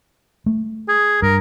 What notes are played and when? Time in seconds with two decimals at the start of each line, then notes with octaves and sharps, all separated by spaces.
0.46 A3
0.88 G#4
1.22 G2 A#4